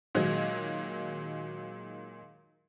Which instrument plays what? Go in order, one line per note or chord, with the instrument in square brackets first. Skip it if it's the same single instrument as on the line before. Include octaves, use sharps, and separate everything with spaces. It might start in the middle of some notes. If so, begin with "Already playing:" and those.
[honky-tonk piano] A#2 D#3 F#3 G#3